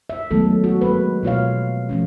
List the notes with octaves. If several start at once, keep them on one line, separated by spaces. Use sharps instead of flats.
E5
D#3 F#3 G#3 A3 B3 A4
F#4
G#3 A#3 B4
B2 F4 C#5 F5
F3 A3 C#4